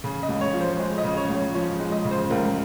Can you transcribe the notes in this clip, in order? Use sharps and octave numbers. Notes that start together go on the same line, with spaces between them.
C#3
D#5
C#2
C#5
F3
C5
G#3 C5
D#5
C#3
C#5
C#2
C#5
F3 C#5
G#3
D#5
C#3
C5
C#2 A#4